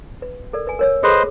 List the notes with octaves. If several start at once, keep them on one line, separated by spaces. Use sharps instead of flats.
B4
A4 A#4 D5
B4 G#5
A#4 C#5 E6
G#4 A4 B4 C5 D#5